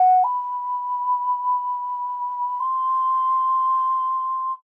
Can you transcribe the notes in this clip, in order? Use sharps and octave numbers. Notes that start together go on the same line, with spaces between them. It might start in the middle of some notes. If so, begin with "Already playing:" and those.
Already playing: F#5
B5
C6